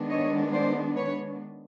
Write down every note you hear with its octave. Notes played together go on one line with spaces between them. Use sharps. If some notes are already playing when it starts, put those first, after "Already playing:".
Already playing: D#3 G#3 B3 D4
C#5 D#5
C5 D5
B4 C#5